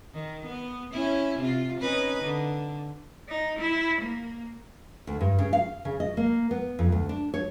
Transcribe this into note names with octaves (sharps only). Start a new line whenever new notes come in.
D#3
B3
C#4 E4
C3 F4
C#4 D#4 B4
D3
D#4
E4
A#3
D2
G2
C#3
F5
C#3
D#5
A#3
B3
F2
D2
D4
C#5